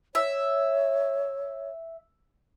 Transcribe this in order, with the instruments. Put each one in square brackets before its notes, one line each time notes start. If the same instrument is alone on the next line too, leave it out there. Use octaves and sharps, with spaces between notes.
[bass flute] C#5 [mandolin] E5